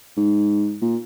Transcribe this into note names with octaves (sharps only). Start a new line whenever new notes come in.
G#2
A#2